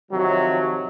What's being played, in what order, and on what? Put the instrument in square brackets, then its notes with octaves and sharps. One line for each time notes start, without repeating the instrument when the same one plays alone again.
[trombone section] C3 D#3 F3 F#3